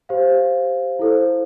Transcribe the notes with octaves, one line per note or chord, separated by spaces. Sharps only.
G4 C5 F5
E4 A4 C5